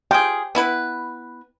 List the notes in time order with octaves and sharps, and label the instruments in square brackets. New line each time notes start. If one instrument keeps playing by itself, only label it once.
[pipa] F4 G#4 [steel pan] G5
[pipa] B3 E4 B4